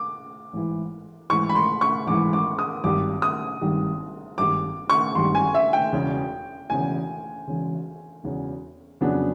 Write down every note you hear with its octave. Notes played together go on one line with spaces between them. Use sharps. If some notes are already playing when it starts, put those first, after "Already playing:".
Already playing: D6
A1 G#2 E3
A1 G#2 E3 C#6
B5
C6
C#6
A1 G#2 E3 D6
D6
D#6
G#1 G2 D#3 G3 D6
D#6
G#1 G2 D#3 G3
G#1 G2 D#3 G3 D6
C#6
G#1 G2 D#3 G3 C6
G#5
E5
G5
E1 E2 C#3
E1 E2 C#3 G#5
E1 E2 C#3
E1 E2 C#3
F2 C#3 F#3 B3 D4